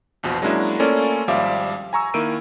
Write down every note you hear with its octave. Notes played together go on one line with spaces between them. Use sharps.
A#1 E2 B2 F3
F#3 G#3 A#3 C#4 D4 E4
A3 A#3 C#4 F4 A4 D5
G#1 F3 G3 E5 F5 D6
G#5 A#5 C#6 E6
D#3 A#3 E4 E6 D7 D#7